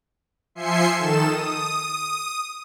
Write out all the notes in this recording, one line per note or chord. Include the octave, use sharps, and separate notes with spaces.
F3 E5 G#5 C6 C7 C#7
D#3 A4 E7
D#6